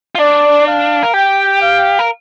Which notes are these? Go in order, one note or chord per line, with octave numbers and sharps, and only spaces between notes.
F4
D4 D5
F5
A#4
G4 G5
F5
A#4